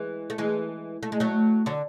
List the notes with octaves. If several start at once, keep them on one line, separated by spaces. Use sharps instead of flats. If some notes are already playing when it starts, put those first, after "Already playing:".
Already playing: E3 G#3
A3
E3 G#3
A3
G#3
F#3 A3
D3 F#3